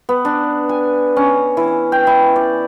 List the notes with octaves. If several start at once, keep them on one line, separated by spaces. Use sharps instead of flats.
B3
D4
G#5
C#4
E3
G5
E4
D5